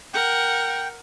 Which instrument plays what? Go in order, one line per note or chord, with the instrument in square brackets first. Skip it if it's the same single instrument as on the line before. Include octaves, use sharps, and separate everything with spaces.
[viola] A#4 F#5 [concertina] G5